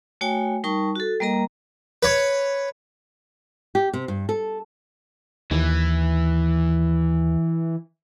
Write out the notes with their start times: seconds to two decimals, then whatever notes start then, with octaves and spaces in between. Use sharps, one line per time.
0.21 A3 F#4 C#5 G5 G#5
0.64 G3 D#4 A#4 A5 C#6
0.96 F#4 A4
1.20 G3 A#3 A#4 D#5 A#5
2.03 B4 C#5
3.75 G4
3.93 C3
4.08 G2
4.29 A4
5.51 D#2 E3